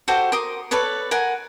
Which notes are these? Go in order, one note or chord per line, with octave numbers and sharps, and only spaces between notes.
F#4 G4 A4 C5
A#4 C6 D6 D#6
A4 B4 C#5 D5
A#4 F#5 G#5